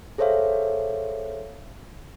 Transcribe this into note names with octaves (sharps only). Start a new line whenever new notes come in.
G#4 A4 C5 C#5 E5 F5